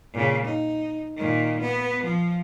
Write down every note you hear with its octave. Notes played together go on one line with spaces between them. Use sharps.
A#2 C#3
D#4
A#2 D#3
B3
F3